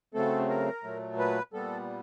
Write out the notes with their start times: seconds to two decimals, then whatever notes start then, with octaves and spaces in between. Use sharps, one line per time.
0.14 C#3 F#3 A3 C4 A4
0.49 A#4
0.84 A#2 F#3 A3
1.18 B4
1.53 A#2 G3 B3 A4